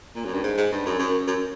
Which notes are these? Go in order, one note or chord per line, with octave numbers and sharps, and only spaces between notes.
A#2
F#2
G2
G#2
G#2
G2
F#2
F#2
F#2